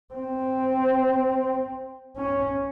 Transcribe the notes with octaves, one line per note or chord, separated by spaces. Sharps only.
C4
C#4